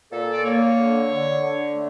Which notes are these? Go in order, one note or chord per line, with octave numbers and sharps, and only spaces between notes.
A#2 A4
D5
A#3 C#5
D3
D3
D3
A3